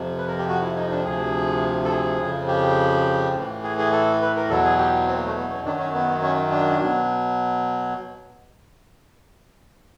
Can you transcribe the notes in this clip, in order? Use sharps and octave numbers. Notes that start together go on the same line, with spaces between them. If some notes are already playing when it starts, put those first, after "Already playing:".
Already playing: F2 C3 F3
B4
A#4
G4
F#4
E4
D#4
D4
D2 C3 F3 G#4
A4
G#4
F2 C#3 F3
G4
A2 E3
G#4
G#4
A4
B4
A#4
E2 B2 F#3 A4
G#4
G4
C4
A#3
A3
B3
C#4
F#2 D#3 F#3 D4
C#4
B3
C#4
D4
B2 F#3